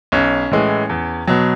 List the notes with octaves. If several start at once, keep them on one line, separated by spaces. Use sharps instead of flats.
B1 C#4
A2 E3 G#3
E2
B2 F#3